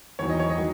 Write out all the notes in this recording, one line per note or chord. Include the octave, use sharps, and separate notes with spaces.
E2 D#3 F#3 C#5
D#5
C#5
D#5
D#3 F#3